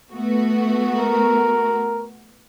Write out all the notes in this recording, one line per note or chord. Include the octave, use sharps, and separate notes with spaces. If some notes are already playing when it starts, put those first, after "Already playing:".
A3 B3 F#4
A#4